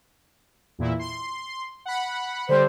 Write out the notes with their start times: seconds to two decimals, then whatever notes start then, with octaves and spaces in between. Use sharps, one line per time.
0.79 E2 A#2 E4
0.99 C6
1.85 F#5 B5
2.49 D3 G3 C5